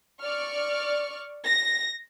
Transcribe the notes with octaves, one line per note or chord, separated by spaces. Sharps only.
D5 C#6 F6
A#6